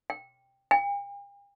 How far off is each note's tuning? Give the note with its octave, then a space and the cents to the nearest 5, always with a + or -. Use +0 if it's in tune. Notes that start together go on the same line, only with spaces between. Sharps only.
G5 +5
G5 +45